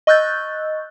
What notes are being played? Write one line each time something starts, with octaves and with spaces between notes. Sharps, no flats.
D#5 C#6 E6 F#6 G6 A6